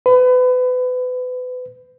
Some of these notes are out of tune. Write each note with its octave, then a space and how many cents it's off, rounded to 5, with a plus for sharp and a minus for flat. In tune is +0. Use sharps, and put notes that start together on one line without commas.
B4 +30